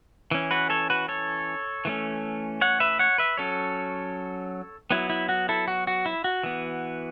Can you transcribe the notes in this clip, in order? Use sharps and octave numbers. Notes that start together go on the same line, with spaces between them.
E3 C#4
F#4 B4
A4 C#5
F#4 B4
A4 C#5
E3 A3 C#4
C#5 F#5
B4 E5
C#5 F#5
B4 E5
F#3 C#4 A4 C#5
F#3 B3 E4
E4
F#4
E4 A4
F#4
F#4
E4
F#4
E3 B3